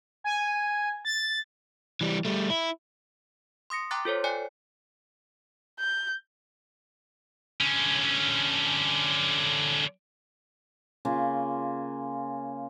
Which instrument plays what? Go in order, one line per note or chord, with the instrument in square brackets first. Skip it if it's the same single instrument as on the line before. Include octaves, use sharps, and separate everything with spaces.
[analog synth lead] G#5
A6
[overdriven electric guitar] E3 G3
G3 A3
E4
[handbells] C6 D#6 A#6 C#7
G5 A#5 C6 D6 F#6 A6
F4 A4 C5 C#5
D5 G5 G#5 F#6 C#7
[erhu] G6
[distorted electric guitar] D3 C#4
[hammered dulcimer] C#3 A#3 F4